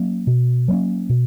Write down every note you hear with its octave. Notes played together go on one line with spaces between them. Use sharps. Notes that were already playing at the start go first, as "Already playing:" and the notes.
Already playing: F#3 A#3 C#4
B2
F#3 A#3 C#4
B2